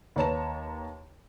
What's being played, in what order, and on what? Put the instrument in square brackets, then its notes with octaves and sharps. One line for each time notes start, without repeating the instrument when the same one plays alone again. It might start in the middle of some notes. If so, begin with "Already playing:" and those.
[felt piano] D#2 B4 C#5 A5 A#5 E7